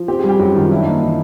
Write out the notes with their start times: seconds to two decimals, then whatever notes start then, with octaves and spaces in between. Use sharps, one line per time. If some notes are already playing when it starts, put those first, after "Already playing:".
Already playing: F3
0.08 C4 G4
0.19 G#4
0.24 G3
0.29 G4
0.39 F#2 F#4
0.55 D#3 F4
0.71 D4 E4
0.81 D#4
0.86 A#3
1.02 E3